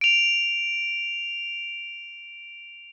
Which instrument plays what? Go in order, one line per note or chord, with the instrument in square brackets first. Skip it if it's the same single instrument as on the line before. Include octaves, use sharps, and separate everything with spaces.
[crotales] D7 F7